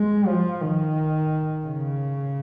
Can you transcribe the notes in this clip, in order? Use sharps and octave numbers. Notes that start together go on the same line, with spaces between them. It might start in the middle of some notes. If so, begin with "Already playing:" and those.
Already playing: G#3
F3
D#3
C#3